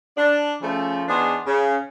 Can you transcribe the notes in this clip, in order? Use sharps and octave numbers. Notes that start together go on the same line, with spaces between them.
D4
C#3 F3 A3
E2 B3 D4 D#4 G#4 C5
C#3